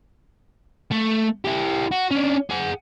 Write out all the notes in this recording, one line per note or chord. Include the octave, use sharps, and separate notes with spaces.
A3
E4 G4
F#4
C#4 D4
G#4 F#5